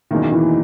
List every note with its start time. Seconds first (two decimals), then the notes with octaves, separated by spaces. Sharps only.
0.11 F#1 E2 B2 D#3 A#3 E4
0.32 E3